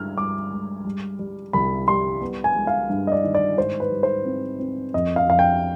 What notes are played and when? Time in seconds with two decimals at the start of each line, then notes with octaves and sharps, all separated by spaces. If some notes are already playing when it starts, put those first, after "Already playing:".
Already playing: G2 G#3 F6
0.17 G2 D6
0.51 G#3
0.85 G3
1.19 G3
1.53 C2 B5
1.88 G3 C6
2.21 B3
2.44 G#5
2.56 G#3
2.67 F5
2.89 G2
3.07 D#5
3.12 D5
3.24 D#3
3.35 D5
3.57 G#2 C5
3.80 B4
3.92 G3
4.03 C5
4.25 C4
4.60 C4
4.94 F2 D#5
5.16 F5
5.28 F2 F5
5.39 G5